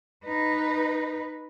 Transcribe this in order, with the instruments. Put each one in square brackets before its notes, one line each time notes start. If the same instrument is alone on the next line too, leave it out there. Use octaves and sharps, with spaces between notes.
[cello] D#4 B4